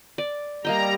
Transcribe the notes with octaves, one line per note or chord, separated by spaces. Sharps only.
D5
G3 A#3 D#5 G5 A#5